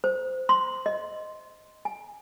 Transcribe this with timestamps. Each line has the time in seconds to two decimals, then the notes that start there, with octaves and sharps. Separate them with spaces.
0.04 C5
0.49 C6
0.86 D#5
1.85 G#5